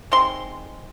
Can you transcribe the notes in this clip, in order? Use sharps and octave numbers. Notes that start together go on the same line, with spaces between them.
D#3 G#3 C4 C6